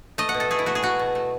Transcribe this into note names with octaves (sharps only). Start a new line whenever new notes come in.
A3 D#5
F#5
B2
A4
A3 G#4
E4
A3 F#4
G#4
B2 F#4
B2
A3